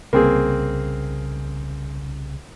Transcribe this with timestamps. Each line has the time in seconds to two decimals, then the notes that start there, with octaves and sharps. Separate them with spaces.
0.13 C2 C#3 A#3 C4 G#4